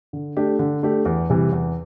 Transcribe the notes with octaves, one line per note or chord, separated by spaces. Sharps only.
D3
A3 D4 G4
D3
A3 D4 G4
E2
C3 E3 G3
E2